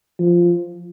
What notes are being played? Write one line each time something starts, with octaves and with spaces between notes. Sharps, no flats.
F3